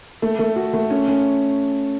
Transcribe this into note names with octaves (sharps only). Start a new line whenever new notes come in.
A3
A3
F#4
A3
C#4
C#4